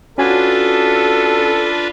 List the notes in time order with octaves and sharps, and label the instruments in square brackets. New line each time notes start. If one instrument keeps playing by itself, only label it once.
[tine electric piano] C#4 F#4 G#5 [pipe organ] D4 F4 B4 [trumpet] A4